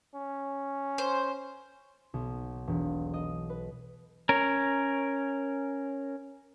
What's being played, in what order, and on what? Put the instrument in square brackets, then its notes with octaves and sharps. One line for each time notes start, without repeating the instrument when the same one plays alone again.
[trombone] C#4
[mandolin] C5
[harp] B1
E1
D#5
B4
[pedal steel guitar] C#4 A#4